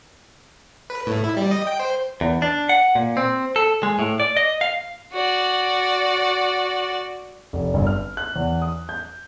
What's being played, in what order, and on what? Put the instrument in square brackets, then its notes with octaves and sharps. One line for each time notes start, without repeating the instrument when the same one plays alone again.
[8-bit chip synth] B4
A2
E4
G3
D#5
G5
C5
[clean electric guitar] E2
D4
F#5
A#2
C4
A4
G#3
A2
D5
D#5
F5
[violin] F#4 D5
[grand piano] F1
G1
F6
F#6
E2
D#6
G6